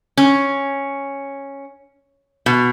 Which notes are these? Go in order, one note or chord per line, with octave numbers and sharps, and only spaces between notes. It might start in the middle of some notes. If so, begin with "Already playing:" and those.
C#4
B2